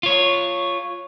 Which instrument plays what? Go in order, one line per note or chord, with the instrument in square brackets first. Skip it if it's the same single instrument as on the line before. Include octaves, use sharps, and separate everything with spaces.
[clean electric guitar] F4 C#5